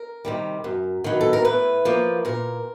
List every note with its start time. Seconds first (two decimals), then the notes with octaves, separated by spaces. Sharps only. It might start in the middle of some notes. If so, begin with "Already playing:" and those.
Already playing: A#4
0.25 C3 D#3 G3
0.64 F#2
1.04 D#3 F#3 B3
1.21 A4
1.33 A#4
1.45 A2 B4
1.85 F3 A#3
2.25 A#2 A#4